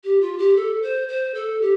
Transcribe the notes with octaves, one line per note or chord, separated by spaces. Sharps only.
G4
F4
G4
A4
C5
C5
A4
G4